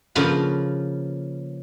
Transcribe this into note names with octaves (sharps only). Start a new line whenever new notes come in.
C#3 F3 A#3 F4 B4